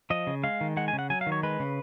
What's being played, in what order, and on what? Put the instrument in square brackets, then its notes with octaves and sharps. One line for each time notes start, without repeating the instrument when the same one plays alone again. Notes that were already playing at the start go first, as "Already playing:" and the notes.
[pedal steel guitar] F3 D#5
C#3
G#3 F5
D#3
G#3 F#5
G#5
C#3
F#5
F#3 G#5
F5
D#3
C#5
G#3 B4
C#3